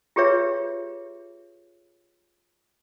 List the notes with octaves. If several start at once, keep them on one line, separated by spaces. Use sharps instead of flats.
F4 G4 G#4 B4 C#5 E5